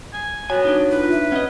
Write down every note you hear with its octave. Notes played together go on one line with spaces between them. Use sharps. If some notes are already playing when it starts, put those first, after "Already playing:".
G#5
F#3 B3 G#5
D4 D#4
F4 B4
E5
B3 C#4 D#5